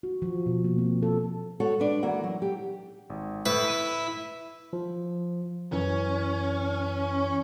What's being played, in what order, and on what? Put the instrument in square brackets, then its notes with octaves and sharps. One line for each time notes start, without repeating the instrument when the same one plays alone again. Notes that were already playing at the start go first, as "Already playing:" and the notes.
[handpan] F#4
F3
B2
A#3
C4
A4
[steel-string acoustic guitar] F#4 A4 C#5 F#5
D4 B4
E3 A#3 F#4 F#5
F#3
G4
[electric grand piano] G#1
[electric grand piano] A2 [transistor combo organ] E4 [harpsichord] B4
[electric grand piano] B5 D#7
[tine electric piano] F3
[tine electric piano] F#2 E3 [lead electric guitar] C#4